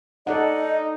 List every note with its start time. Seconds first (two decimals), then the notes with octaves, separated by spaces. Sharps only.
0.27 D#4 A4 D5 D#5 F#5